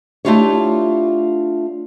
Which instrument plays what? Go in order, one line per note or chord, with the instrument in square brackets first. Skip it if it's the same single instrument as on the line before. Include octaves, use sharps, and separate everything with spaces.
[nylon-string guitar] A3 D4 E4 F4 G4 C#5